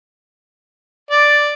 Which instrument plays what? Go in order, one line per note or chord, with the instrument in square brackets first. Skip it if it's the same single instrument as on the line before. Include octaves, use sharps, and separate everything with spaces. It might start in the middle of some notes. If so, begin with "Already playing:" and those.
[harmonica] D5